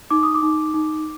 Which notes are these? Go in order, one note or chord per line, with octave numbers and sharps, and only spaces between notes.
D#4 D6
D#6
D6
D#4
D#4